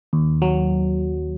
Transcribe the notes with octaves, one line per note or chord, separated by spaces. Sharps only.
D#2
F#3